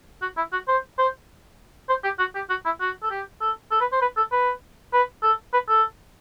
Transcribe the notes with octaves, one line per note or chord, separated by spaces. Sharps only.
F#4
E4
F#4
C5
C5
C5
G4
F#4
G4
F#4
E4
F#4
A4
G4
A4
A4
B4
C5
B4
A4
B4
B4
A4
B4
A4